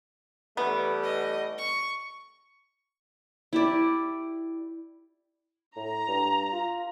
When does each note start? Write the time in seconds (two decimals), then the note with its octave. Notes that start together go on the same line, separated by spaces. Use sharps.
0.57 E3 G3 A3 B3
1.03 D#5
1.58 C#6
3.53 E4 G4 D5
5.76 A2 A#5
6.08 G2
6.52 F4